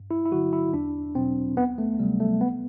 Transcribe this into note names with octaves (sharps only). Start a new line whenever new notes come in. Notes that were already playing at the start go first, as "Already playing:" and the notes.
Already playing: G2
E4
E4
D3 F#3 F#4
E4
E2 D4
B2 F#3 C4
D2 B3
A3
C3 F#3 G3
A3
C2 B3